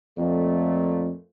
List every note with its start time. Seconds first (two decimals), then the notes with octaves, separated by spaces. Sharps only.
0.18 F2 A#2 A3